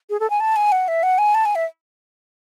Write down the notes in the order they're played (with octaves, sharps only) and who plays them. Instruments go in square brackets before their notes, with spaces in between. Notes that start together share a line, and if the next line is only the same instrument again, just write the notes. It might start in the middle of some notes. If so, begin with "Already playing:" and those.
[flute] G#4
A4
G#5
A5
G#5
F#5
E5
F#5
G#5
A5
G#5
E5